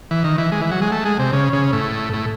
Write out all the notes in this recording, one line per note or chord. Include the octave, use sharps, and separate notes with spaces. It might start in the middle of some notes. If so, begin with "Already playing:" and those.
E3
D#3
E3
G#3
E3
F#3
G#3
A3
G#3
C3
C#3
C#3
A2
A2